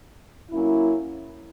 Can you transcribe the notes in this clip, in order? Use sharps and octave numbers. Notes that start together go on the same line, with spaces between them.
F#3 A#3 C#4 E4